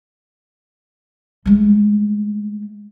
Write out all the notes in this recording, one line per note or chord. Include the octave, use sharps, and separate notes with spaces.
G#3 A3